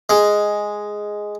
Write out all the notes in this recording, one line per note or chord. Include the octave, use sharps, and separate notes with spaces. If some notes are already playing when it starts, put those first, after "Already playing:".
G#3